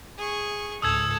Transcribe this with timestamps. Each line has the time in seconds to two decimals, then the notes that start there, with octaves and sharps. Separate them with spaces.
0.17 G#4 C#6
0.82 C#2 G#2 A4 D#6 E6 G#6